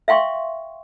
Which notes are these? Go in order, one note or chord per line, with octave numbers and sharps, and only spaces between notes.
E5 F5 G5 C6 C#6